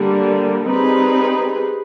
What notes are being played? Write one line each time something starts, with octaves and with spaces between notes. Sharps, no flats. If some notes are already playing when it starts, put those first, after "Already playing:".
Already playing: D3 G3 A#3
G3 C4 D#4 G#4 B4